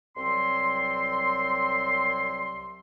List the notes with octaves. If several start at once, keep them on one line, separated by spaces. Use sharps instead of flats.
C2 F#3 C4 C6